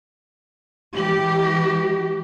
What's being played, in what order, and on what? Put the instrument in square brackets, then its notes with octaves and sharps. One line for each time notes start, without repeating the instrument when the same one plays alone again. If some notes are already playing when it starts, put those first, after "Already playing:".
[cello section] E3 G#3 G4